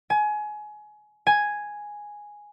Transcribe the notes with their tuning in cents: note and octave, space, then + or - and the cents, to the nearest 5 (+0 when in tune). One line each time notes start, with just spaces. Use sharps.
G#5 +25
G#5 +0